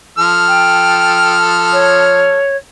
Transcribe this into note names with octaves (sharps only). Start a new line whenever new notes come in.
F3 A4 F6
G5
C#5